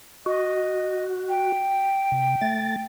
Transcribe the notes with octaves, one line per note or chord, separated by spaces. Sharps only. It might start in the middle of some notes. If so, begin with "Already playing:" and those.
F#4 D#5
G5
C3
A3 A6